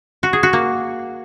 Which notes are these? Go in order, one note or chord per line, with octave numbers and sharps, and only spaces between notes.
F#4
G#4
F#4
A#3